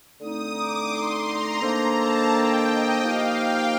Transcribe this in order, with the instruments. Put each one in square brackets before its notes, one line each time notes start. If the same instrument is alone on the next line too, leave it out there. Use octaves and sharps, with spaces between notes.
[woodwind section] D3 A3 C4 D#4 [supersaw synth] D#6
[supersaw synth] D6
C6
A#5
[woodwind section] D#3 A#3 D4 A4 C5
[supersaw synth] A5
G5
D#5
[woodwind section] F3 A#3 D#4 G4 A#4 [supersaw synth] F5
[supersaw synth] G5